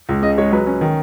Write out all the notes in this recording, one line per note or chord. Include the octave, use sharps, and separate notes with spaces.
C#2
C#3 D#5
G#3 C#5
F#3 B4
C#4
D#3